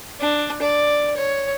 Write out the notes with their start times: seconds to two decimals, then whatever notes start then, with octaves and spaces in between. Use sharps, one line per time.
0.20 D4
0.62 D5
1.17 C#5